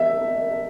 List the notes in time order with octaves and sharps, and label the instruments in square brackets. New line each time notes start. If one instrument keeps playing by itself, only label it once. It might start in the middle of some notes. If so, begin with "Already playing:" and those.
Already playing: [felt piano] E5